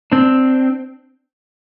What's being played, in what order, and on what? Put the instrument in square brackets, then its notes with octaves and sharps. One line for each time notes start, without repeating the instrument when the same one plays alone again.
[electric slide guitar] C4 D4